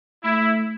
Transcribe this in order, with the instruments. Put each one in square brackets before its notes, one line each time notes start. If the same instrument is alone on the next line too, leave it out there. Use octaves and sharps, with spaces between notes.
[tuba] A3 [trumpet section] E4